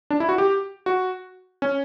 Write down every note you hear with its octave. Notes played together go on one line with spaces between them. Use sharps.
D4
E4
F#4
G4
F#4
C#4